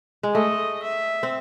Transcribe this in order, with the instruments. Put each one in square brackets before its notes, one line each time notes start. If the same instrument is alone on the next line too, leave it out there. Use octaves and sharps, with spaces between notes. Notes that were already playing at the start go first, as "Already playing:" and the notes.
[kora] G#3
[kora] A3 [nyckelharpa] D#5
[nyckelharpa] E5
[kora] C4